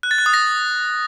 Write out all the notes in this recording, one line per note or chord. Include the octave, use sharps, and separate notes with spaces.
F#6
A6
F#6
D#6
A#6